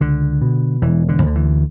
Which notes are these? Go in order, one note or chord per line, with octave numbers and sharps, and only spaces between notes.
C#2 D3
B2
E1 E3
D3
D2 D3
E3